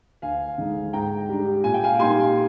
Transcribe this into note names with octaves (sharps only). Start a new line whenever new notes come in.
D2 F5 G#5
D3 G#3 D#4
G#2 G5 A#5
G3 D4
A#2 G#5
G5
F5 G#5
G3 A#3 D#4 G#5 C6